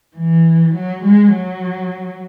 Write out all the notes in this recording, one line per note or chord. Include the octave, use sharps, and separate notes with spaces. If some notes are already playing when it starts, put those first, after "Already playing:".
E3
F#3
G#3
F#3